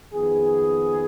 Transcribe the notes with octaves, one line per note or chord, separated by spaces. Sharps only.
F2 D#3 B3 G#4